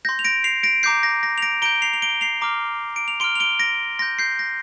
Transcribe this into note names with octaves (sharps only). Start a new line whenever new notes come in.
C6 G6 A#6
F7
A#6 D7
C7 F7
A#6 D7
A#5 D6 G6 C7
A#6
A#6
F7
A#6 D7
A#5 G6 D7 G7
C7 F7
F7
D7 G7
C7 F7
A#5 D6 F6
D7
F7
C6 F6 D7 G7
F7
D7 G7
A#6 D7
C6 G6 A#6
G6 C7
A#6